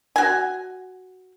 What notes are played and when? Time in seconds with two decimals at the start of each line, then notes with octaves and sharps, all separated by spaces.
0.16 F#4 G#5